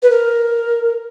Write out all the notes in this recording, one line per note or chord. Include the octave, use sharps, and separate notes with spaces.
B4
A#4